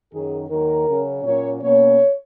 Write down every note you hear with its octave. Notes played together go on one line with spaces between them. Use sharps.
F#2 D#3 F#3 G#4
D#2 D#3 F#3 A#4
C#3 F#3 C#4
A#2 F#3 A#3 C#4 C#5
B2 A#3 C#4 C#5